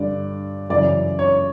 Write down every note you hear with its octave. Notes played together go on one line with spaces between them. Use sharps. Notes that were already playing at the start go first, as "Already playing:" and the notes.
Already playing: G2 D3 D5
F#2 C#3 E3 D5
C#5